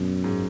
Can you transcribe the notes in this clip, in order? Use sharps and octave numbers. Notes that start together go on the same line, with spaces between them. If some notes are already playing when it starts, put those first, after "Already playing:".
Already playing: F#2 B2
G#2